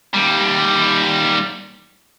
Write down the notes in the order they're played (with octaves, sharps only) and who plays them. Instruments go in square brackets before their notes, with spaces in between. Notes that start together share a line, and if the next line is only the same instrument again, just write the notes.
[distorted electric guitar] D#2 G3